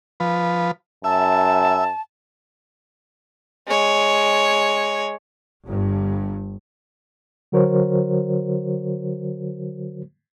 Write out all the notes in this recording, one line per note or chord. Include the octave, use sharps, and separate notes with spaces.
F3 B4
F#2 E5 A5
G#3 C#5
G1 G2
D3 F#3 F#4 A#4 C5 C#5